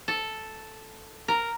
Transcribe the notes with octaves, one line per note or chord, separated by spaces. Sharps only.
A4
A#4